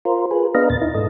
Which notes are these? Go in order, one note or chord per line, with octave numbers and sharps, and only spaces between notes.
F4 A#4 C5
G#4 B4
B3 D4 B4 D#5 F5 A#5
D#2 A#2 A6
D#4 E4
G#2 A4 D#5